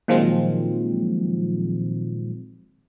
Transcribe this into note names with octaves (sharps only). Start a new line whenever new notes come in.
A#2 D#3 F3 F#3 G#3 C4